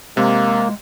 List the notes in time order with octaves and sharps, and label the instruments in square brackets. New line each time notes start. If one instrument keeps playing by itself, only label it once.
[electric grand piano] C3 [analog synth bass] G#3 [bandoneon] A#3